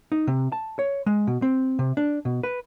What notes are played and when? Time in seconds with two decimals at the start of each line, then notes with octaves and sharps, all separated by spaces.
0.12 D#4
0.27 C3
0.52 A5
0.79 C#5
1.06 G#3
1.27 B2
1.42 C4
1.79 C3
1.97 D4
2.25 B2
2.43 B4